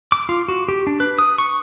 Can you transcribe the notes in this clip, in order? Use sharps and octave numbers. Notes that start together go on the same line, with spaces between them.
D6
F4
F#4
G4
D4
B4
D#6
C#6